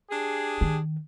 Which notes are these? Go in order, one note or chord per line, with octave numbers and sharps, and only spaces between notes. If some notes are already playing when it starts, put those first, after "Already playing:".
D4 G4 G#4
D#3